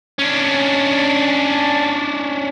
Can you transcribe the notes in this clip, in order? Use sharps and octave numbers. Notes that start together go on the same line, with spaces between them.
C#4 D4